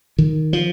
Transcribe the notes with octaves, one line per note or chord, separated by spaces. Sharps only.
D#3
F3